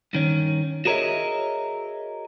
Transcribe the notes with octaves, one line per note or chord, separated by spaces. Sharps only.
G2 D#3 C#4
F#4 G#4 A#4 C#5 D#5 E5